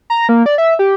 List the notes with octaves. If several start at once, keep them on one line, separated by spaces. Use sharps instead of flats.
A#5
A#3
D5
E5
G4